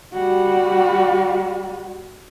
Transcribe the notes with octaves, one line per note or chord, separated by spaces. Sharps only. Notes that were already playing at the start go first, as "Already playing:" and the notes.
G3 F#4